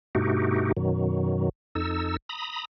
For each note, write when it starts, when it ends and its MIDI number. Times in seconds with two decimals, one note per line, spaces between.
0.15 0.72 43
0.15 0.72 47
0.15 0.72 57
0.15 0.72 63
0.15 0.72 66
0.15 0.72 67
0.77 1.49 42
0.77 1.49 47
0.77 1.49 51
0.77 1.49 54
1.75 2.16 41
1.75 2.16 63
1.75 2.16 69
1.75 2.16 88
2.29 2.65 82
2.29 2.65 83
2.29 2.65 87